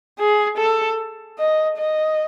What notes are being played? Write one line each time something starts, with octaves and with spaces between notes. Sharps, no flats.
G#4
A4
D#5
D#5